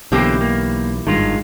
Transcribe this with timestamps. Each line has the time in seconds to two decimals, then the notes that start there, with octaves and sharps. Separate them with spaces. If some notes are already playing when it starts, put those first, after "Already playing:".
0.12 B1 B2 D3 E3 A#3 C4 G4
0.41 A#3
1.07 G#1 G2 D#3 G#3 F4